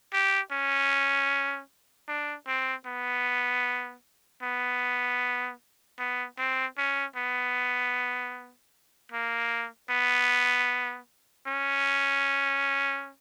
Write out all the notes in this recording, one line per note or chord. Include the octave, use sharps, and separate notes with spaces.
G4
C#4
D4
C4
B3
B3
B3
C4
C#4
B3
A#3
B3
C#4